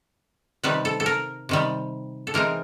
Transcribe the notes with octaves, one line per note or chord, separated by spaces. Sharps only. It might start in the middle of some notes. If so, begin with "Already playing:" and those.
C3 D#3 G3 B4
A4
A4
A#4
C3 D#3 G3
A4
E3 G#3 C4 D#4 A#4